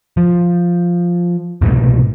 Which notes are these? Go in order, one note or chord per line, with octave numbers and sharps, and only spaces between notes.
F3
C2 G#2 B2 G3